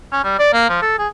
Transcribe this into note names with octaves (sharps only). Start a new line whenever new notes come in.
C#4
G3
D5
A#3
F3
A4
G#4